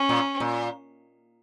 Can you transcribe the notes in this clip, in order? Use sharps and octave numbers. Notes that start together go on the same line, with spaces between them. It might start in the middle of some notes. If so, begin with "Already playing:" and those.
Already playing: C#4
A#2
A#2